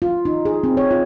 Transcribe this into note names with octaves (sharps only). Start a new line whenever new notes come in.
F4
D#4
G#4
C4
C#5
F4